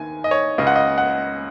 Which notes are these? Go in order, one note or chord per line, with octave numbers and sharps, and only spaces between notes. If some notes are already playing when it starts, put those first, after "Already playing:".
Already playing: D#2 D#3 G#5
D#5
C#5
C#2 C#3 D#5
F#5
D#5
F#5